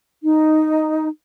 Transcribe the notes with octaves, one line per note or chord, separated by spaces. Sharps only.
D#4